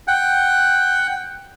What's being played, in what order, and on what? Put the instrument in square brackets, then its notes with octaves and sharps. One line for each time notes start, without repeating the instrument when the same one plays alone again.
[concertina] F#5 G5